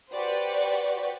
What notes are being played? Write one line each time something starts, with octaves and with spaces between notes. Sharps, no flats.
F#4 G4 B4 C5 D5